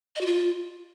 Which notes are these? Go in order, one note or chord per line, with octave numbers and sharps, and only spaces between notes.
D#5
F#4
F4